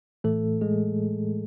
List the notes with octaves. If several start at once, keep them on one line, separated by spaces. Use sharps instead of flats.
A2 E3 A3 A4
G#3 G#4